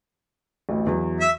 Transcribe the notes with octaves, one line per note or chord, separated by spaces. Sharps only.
A1 D2
E2 F#3
E5